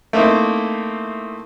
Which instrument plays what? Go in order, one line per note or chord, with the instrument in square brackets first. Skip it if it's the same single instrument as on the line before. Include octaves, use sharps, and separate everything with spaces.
[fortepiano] A3 A#3 C4 D#4 E4